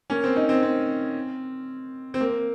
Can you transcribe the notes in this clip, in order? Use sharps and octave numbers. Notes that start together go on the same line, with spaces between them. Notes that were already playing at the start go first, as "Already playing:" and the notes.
A#3 C#4
C4
C4 D#4
C4
C4
C4
A#3